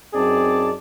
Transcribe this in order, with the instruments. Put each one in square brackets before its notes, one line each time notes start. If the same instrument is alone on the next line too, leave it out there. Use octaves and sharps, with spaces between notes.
[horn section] F#2 C4 D#4 G#4 D5 A5